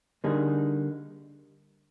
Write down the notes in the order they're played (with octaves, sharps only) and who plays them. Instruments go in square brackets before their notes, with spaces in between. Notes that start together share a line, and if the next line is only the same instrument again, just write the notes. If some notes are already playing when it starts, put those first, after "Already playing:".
[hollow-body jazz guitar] D3 G3 A#3 D#4 G#4